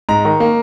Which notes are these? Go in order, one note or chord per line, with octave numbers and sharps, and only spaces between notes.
G#2 A#5
D#3
A#3